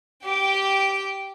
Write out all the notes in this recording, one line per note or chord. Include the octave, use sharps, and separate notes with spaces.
G4 G5